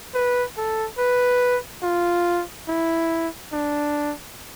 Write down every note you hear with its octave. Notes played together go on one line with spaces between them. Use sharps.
B4
A4
B4
F4
E4
D4